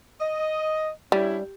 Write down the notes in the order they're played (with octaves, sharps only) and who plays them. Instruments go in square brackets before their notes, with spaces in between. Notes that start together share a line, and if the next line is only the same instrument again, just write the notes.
[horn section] D#5
[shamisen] G3 [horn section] C#4 D4 E4